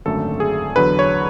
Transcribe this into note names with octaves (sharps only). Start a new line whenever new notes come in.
G#1 F#2 D3 A3 A4
G#4
E2 D3 F#3 B4
C#5